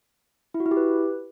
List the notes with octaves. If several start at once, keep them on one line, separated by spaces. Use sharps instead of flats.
E4
F#4
E4
G4
B4